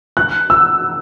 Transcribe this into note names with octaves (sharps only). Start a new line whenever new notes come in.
F#6
E6